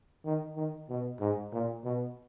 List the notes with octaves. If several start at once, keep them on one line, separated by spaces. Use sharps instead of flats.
D#3
D#3
B2
G#2
A#2
B2